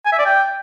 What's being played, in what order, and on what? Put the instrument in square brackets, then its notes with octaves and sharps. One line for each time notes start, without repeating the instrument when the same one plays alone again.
[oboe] G#5
E5
D5
G5